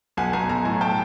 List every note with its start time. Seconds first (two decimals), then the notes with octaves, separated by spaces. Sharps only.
0.17 B1 F#5 G#5
0.33 B1 G#5 A#5
0.49 B1 G#5 A#5
0.65 A2 G#5 A#5
0.81 G5 A5